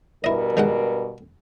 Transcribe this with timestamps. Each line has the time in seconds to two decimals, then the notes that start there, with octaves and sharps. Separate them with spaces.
0.24 G2 B2 E4 A#4 D#5
0.57 D#3 G#3 F#5